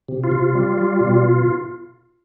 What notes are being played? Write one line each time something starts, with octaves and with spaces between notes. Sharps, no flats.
C3
F4
C3
G3
G3
B2